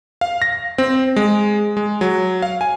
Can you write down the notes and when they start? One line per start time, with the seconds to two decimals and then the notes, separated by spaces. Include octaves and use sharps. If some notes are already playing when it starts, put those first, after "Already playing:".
0.21 F5
0.42 A#6
0.78 C4
1.16 G#3
1.77 G#3
2.01 F#3
2.42 F5
2.61 G#5